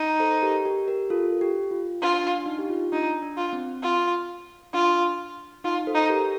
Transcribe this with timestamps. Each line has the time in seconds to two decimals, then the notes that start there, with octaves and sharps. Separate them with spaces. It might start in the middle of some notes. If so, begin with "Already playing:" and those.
Already playing: D#4
0.20 A4 C5
0.42 G4 A#4
0.65 G4 A#4
0.88 G4 A#4
1.10 F4 A4
1.41 G4
1.71 F4
2.01 D4 F4
2.24 D4
2.46 D#4
2.59 G4
2.69 F4
2.92 D4 D#4
3.22 D4
3.37 F4
3.53 C4
3.83 F4
4.73 D4 F4
5.64 D#4 F4
5.87 A4 C5
5.95 D#4
6.10 G4 A#4